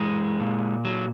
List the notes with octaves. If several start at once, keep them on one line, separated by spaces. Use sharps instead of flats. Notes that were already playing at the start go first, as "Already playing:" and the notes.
Already playing: F#2 E3 G#3
A#2
F#3